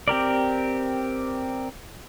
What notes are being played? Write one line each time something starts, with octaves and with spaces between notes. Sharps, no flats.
C4 G4 A#4 D5